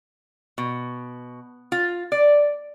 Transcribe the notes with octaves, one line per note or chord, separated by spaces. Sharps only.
B2
F4
D5